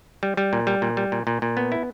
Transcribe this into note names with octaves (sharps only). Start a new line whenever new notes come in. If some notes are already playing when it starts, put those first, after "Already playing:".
G3
G3
A#2
G3
A#2
G3
A#2
A#2
A#2
B3
E4